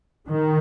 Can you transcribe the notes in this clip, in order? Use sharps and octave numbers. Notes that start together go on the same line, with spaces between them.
D#3